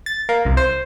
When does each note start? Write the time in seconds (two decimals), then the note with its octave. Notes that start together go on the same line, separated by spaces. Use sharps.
0.06 A6
0.29 A#3
0.45 C2
0.57 C5